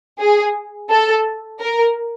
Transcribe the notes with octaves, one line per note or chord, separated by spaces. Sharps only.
G#4
A4
A#4